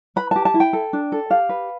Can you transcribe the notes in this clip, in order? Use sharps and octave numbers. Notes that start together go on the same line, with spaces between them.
B4 B5
G4 A5
A5
E4
G5
A4
D4
A4
G4 F5
B4